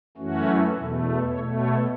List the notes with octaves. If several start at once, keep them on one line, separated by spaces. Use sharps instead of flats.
F#2 E3 A3 C#4 F#4
E2 B2 A3
B2 A3 A4 C#5
A4 C#5